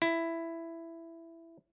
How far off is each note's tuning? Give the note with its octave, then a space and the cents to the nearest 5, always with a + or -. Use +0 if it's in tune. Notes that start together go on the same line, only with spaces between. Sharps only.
E4 +10